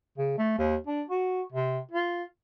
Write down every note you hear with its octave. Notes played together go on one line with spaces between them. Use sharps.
C#3
A3
D#2
D4
F#4
C3
F4